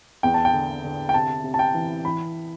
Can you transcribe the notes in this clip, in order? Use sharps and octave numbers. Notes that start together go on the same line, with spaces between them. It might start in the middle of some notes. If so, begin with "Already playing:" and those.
E2 G5
A5
G5
D3
D3
G5
C3 A5
C3
A5
G5
E3
E3 B5